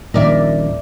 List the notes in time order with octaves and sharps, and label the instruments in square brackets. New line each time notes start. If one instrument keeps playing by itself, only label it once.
[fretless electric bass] D#1 A#1 D#3 [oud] A#4 D5 E5